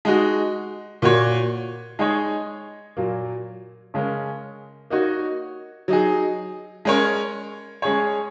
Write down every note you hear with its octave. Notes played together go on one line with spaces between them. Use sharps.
G#3 D#4 F#4
A#2 A#3 F#4 C#5
G#3 D#4 G#4 C#5
A#2 F#3 A#3
C#3 G#3 C#4 A#4
A#3 D#4 F#4 C#5
F#3 D#4 G#4
G#3 C#4 A#4 C#5
G#3 C#4 G#4 C#5